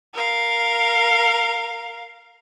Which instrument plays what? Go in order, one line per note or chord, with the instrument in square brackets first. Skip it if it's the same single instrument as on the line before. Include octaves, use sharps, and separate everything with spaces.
[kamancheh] A#4 F5